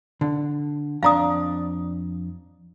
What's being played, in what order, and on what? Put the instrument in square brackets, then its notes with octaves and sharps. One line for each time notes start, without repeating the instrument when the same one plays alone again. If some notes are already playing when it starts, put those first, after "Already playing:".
[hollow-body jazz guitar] D3
[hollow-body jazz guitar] F2 D4 [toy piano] F5 A#5 D#6